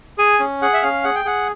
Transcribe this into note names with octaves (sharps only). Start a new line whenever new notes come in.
G#4 G#5
C#4
G#4 F#5
E5
C#4 F5
G#4 F#5
G5
G#4 F#5